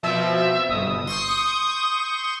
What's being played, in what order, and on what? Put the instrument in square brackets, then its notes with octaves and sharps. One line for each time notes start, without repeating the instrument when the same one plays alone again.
[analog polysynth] B2 F3 C4 [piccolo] E5
[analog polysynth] G1 B2 [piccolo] D#6
[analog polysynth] C6 C#6 G6